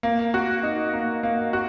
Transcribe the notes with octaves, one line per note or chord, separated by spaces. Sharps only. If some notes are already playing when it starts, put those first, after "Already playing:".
A#3
F#4
D#4
A#3
A#3
F#4